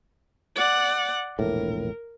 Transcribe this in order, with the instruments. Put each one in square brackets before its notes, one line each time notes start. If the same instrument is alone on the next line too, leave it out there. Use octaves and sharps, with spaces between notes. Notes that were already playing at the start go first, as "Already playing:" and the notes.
[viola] D5 F#5
[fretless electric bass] E1 A#1 A2 [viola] A#4